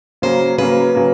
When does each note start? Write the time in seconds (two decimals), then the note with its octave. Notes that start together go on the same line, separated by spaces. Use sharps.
0.22 C#3 F#3 A#3 C5
0.58 C#3 F#3 A#3 B4
0.95 C#3 F#3 A#3